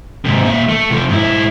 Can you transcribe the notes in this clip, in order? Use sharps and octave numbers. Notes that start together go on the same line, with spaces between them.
G#2 C3
A#2 E5
A3
C3 F3
G#2 E4